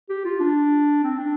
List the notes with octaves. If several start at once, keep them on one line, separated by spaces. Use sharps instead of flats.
G4
F4
D4
C4
D4